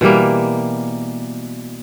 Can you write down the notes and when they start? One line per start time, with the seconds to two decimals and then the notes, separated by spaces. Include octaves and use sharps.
0.01 B2 E3 G3 A#3